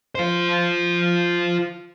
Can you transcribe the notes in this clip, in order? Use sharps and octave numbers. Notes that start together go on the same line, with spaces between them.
F4 C5